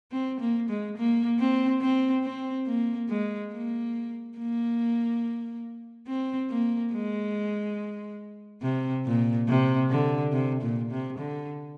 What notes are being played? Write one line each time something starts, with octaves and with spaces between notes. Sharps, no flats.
C4
A#3
G#3
A#3
C4
C4
C4
A#3
G#3
A#3
A#3
C4
A#3
G#3
C3
A#2
C3
D3
C3
A#2
C3
D3